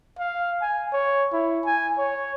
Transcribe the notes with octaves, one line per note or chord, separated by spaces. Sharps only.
F5
G#5
C#5
E4
G#5
C#5